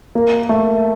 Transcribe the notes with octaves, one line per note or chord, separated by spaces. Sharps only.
A#3
A3